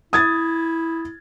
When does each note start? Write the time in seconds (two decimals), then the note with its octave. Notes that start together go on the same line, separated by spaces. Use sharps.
0.13 E4 D#6 G#6 A6